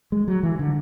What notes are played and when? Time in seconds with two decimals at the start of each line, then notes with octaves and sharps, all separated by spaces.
0.12 G#3
0.28 F#3
0.43 E3
0.59 D3